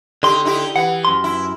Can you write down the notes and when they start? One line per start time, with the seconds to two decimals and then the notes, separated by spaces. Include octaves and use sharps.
0.23 D3 D#4 G4 C6
0.45 D#4 E4 G4
0.76 E3 F#5
1.05 F#2 C6
1.24 E4